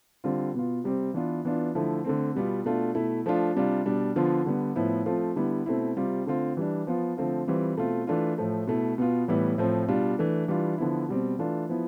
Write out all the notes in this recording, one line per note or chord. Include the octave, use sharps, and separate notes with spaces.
D3 G3 C4 F4
B2 B3 F4
C3 G3 C4
E3 B3 D4 F4
E3 B3 D4 F4
D3 F3 A3 E4
D3 A3 C4
B2 G3 B3 F4
B2 A3 D4 F4
B2 A3 E4
F3 A3 D4 F4
C3 G3 D4 F4
B2 G3 D4
D3 F3 B3 F4
D3 G3 B3
A2 F3 B3 E4
F3 A3 C4 F4
D3 G3 B3 E4
B2 A3 C4 E4
C3 G3 C4 F4
D3 A3 C4 F4
E3 G3 D4
F3 B3 F4
D3 F3 A3 C4 F4
E3 G3 C4 F4
B2 A3 C4 F4
E3 A3 D4 F4
A2 F3 A3
B2 A3 E4
B2 B3 F4
A2 E3 G3 B3 E4
A2 F3 A3 C4
B2 G3 D4 F4
E3 A3 D4
E3 G3 D4 F4
D3 F3 B3 E4
B2 G3 C4
E3 A3 D4 F4
F3 B3 E4